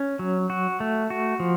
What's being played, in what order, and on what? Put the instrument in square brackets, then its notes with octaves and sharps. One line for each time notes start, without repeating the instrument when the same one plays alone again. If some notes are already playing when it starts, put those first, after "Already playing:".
Already playing: [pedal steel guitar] C#4
F#3
F#4
A3
F#4
F3